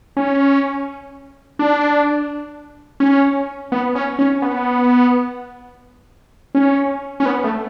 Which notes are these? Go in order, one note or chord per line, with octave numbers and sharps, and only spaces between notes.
C#4
D4
C#4
B3
C#4
C#4
B3
C#4
C#4
B3
A3